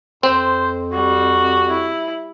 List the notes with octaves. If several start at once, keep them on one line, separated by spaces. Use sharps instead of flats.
F2 C4 C5
G3 F#4
E4